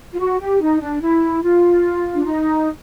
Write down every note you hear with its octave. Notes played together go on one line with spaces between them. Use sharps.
F4
F#4
G4
D#4
D4
E4
F4
D4
D#4